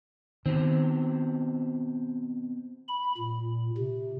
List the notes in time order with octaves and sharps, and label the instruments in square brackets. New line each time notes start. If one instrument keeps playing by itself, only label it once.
[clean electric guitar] B2 C4 [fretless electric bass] D#3
[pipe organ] B5
A#2
C3